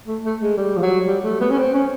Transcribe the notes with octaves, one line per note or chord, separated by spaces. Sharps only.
A3
A3
G#3
G3
F3
F#3
G3
A3
B3
C#4
C4
C#4